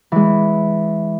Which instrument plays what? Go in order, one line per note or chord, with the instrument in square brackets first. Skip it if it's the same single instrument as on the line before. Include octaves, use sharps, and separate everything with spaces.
[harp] E3 G#3